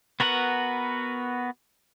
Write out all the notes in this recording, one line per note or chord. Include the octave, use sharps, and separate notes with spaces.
B3 F#4 A#4 B4 F#5